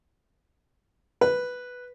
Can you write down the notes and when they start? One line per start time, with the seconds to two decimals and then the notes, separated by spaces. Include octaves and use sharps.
1.21 B4